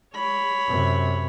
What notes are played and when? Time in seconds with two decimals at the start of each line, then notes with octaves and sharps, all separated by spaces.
0.15 C#5 B5
0.67 F#2 C3